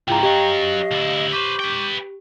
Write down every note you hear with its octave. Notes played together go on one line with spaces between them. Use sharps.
C#2 G#2 E4 F4 G#4 G5 A#5
F#3 C#4 G4 D#5 F5
D2 E4
B4 C5 C#6 D6 G6
B4 G5